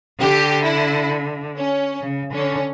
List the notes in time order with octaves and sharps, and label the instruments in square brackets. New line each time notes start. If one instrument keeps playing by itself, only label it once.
[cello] D3 [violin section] G4
[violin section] E4
C#4
[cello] C#3
[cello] D3 [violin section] C#4